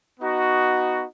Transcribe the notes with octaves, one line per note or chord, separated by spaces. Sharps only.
B3 D#4 F#4